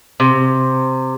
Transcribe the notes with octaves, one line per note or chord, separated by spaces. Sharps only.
C3